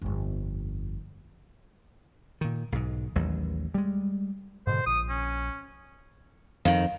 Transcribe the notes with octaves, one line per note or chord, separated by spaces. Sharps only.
G1 F2
A#2 D#3
B1 G#2
A1 D#2 F#3
G3 G#3
G#2 B2 D3 C5
A#1 D#6
C#4
F2 D#3 F5